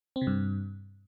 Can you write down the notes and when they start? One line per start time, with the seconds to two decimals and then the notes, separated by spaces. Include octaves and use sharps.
0.16 C4
0.21 C3
0.27 G2